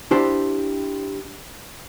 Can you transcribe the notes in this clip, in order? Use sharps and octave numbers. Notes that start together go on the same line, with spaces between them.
D4 E4 G4 C5